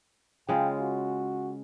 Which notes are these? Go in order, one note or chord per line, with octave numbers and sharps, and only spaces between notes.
C#3 G#3 F4 G5
F#4